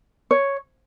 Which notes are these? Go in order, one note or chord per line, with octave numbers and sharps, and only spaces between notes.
C#5